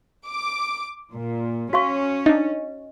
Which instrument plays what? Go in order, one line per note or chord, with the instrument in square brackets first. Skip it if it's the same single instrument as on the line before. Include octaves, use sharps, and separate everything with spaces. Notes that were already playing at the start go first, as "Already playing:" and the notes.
[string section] D6
A#2
[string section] C#4 [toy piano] F#4 F5 C#6
[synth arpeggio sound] D4 D#4 [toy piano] D#5